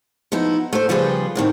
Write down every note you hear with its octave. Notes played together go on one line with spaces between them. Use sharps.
F3 B3 D#4 E4
A3 C5
C#3 F3 G3 G4 G#4 B4
D2 A2 D#3 C4